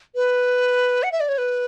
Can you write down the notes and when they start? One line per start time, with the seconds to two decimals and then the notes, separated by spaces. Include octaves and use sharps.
0.15 B4
1.03 F#5
1.12 E5
1.20 D5
1.29 C#5
1.38 B4